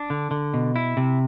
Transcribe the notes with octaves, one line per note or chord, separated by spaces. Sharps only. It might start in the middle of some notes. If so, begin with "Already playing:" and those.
Already playing: D4
D3
D3
B2
E4
C3